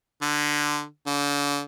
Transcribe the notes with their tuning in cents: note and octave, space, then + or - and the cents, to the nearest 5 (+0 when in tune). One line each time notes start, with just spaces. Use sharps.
D3 +10
D3 -40